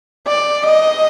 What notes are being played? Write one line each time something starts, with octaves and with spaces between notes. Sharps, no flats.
D5
D#5